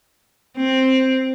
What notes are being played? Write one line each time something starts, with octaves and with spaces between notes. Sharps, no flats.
C4